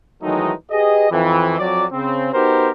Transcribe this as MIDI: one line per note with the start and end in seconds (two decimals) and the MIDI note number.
0.22 0.52 51
0.22 0.52 52
0.22 0.52 54
0.22 0.52 56
0.22 0.52 57
0.22 0.52 63
0.70 1.10 67
0.70 1.10 68
0.70 1.10 71
0.70 1.10 75
1.10 1.58 41
1.10 1.58 52
1.59 1.85 41
1.59 1.85 54
1.59 1.85 74
1.92 2.31 49
1.92 2.31 60
2.33 2.71 59
2.33 2.71 63
2.33 2.71 66
2.33 2.71 67
2.33 2.71 70
2.33 2.71 72